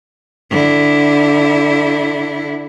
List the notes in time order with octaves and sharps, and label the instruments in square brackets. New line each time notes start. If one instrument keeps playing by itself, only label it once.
[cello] D3 E4